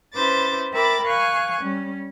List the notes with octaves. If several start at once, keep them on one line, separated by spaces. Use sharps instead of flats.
C#4 E4 B4 C5 D6 A6
A#4 E5 G5 B5 D6 A6
F5 G#5 C#6 F#6
G3 C#4